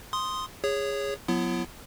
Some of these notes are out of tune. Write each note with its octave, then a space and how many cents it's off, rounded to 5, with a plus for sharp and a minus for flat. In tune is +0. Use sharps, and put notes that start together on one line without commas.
C6 +0 D#6 +0
G#4 -20 C#5 +0
F#3 -30 B3 +0 E4 +40